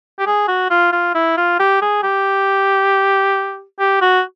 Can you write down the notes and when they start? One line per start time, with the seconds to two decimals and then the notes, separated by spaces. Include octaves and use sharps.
0.19 G4
0.26 G#4
0.48 F#4
0.70 F4
0.92 F4
1.14 E4
1.37 F4
1.59 G4
1.81 G#4
2.03 G4
3.79 G4
4.01 F#4